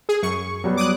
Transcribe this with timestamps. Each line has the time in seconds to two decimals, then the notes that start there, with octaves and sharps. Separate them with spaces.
0.09 G#4
0.23 F#2 C#6
0.64 F#3 G3 B3
0.77 D6 D#6 F#6